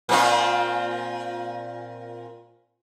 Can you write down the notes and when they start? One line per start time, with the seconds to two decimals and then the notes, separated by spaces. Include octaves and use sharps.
0.09 A#2 C4 F4